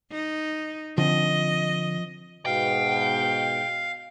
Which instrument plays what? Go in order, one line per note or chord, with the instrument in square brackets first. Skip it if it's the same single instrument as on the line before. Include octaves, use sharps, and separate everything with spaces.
[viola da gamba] D#4
[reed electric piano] D3 [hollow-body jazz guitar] F3 C4 [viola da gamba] D#5
[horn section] G#2 B2 [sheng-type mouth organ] F5 [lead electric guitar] G5